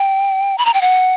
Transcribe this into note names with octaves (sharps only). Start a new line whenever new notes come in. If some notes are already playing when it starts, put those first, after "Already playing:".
Already playing: G5
B5
A#5
G5
F#5